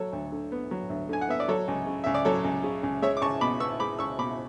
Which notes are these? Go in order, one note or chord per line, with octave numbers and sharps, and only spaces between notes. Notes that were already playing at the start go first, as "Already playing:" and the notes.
Already playing: F#3 A4 C#5
D2
D3
B3
F#3
D2
D3 G#5
F#5
B3 E5
D5
F#3 A4 C#5
C#2
C#3
C#2 E5
D5
F#3 A4 C#5
C#2
C#3
C#2
G#3 C#5 E5
D6
C#2 A5 C#6
B2 B5 D6
B3 C#6 E6
G#3 B5 D6
C#2 C#6 E6
B2 B5 D6